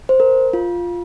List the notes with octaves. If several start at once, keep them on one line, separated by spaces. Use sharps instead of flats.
C5
A#4
F4